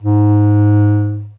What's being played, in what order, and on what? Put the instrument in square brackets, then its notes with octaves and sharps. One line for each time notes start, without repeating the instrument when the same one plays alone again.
[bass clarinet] G#2